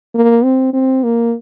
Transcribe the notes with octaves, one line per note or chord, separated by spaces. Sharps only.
A#3
C4
C4
A#3